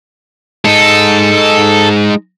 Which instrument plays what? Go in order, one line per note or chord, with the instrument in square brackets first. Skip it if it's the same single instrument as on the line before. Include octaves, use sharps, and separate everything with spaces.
[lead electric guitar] G#3 D#4 [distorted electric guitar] A4